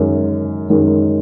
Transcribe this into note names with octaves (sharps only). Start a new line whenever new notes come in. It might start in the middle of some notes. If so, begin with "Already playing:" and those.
Already playing: F#2 D#3 G#3
F#2 D#3 G#3